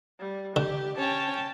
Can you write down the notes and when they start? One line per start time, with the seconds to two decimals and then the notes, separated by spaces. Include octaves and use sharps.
0.20 G3
0.56 D3 G4
0.98 C#4 G5 A5